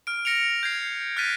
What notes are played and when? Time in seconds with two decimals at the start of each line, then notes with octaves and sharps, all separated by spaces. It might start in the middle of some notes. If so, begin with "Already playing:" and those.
0.07 F6 D7
0.25 F6 A#6 C#7 D7 F7
0.63 G6 G#6 C7
1.17 F6 F#6 A6 B6 D#7